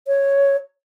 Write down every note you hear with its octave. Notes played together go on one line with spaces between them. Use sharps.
C#5